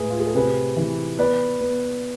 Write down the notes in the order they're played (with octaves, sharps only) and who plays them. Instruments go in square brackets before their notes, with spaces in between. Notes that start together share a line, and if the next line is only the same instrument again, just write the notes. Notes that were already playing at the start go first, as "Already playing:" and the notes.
Already playing: [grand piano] A2 G#3 E4 G#4 B4
F4
G#4
A4
C3 G#4 B4
E3
B3 B4 D5
B3